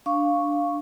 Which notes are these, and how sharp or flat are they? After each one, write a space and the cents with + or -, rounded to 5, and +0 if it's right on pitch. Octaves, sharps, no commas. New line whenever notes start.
D4 +0 F5 +0 C#6 +0